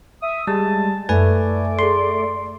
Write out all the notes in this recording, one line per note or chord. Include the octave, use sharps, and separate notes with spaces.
E5 D#6
G3 G#3 A5
F#2 A3 B4 D5 G#5
G#4 A4 C6